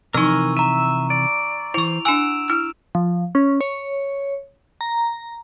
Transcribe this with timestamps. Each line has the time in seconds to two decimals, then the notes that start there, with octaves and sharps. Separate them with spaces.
0.14 C3 E3 F3 D#4 A#4 G#5 C#6 E6
0.57 E5 A#5 D#7
1.10 D5
1.74 E3 E4 C5 C#6 F7
2.05 D4 F#5 G#5 E6 D7 E7
2.50 E4 F6
2.95 F3
3.35 C#4
3.61 C#5
4.81 A#5